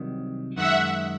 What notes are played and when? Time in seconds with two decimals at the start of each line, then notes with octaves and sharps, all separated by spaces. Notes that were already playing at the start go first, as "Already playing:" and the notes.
Already playing: C2 C3 D#3 F#3
0.55 F#2 D#3 G#3 E5 F#5